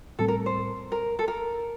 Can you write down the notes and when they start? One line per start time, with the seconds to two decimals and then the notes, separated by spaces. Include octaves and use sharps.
0.19 A2 G3 C4 A4
0.28 A#4
0.46 C5
0.92 A#4
1.19 A4
1.28 A#4